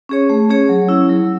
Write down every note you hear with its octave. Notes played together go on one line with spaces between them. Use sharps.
C#4 G#4 C#5
A3
C#4 G#4 C#5
F#3
C#4 E4
F#3